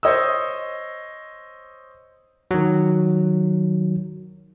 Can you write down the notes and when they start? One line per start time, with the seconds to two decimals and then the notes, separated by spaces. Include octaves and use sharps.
0.03 C5 C#5 D#5 D#6 E6
2.51 D#3 F#3